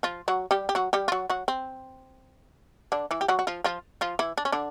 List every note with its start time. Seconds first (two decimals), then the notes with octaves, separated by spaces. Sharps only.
0.03 F3 F4
0.28 F#3 F#4
0.51 G3 G4
0.69 G4
0.75 F#3 F#4
0.93 G3 G4
1.08 F4
1.12 F#3 F#4
1.30 F#3 F#4
1.48 C4
2.92 D3 D4
3.11 E3 E4
3.21 G4
3.28 F#3 F#4
3.39 F#4
3.47 F3 F4
3.64 F3 F4
4.01 F3 F4
4.19 E3 E4
4.38 D4
4.45 C#4
4.52 D3 D4